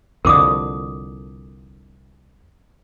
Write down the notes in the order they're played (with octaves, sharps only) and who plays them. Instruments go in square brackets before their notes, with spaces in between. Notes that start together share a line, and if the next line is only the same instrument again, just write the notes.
[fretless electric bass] C2 F2 D3 [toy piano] A#4 D6 D#6